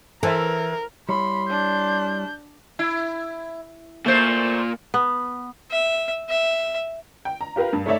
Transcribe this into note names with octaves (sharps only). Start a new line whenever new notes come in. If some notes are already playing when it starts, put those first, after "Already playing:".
E3 A4 A#4 C5 E5
G3 E4 C#5 B5 C6
D4 G6
E4
A#2 A3 C5
B3
E5
E5
G5
A#5
F4 G4 A#4 B4 F5
G2
A3 D#4 A4 C#5 D5 E5